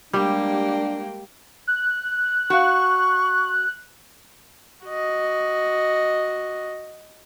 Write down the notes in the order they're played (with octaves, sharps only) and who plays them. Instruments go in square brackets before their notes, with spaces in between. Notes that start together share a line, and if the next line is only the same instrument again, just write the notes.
[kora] G3 [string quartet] G#3 A#3 G4 [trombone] D4
[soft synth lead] F#6
[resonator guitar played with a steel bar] F#4 F5 [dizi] C#6
[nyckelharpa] F#4 D#5